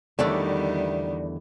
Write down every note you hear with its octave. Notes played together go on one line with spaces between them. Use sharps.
E2 D3 D#3 G3 A3 B3 D5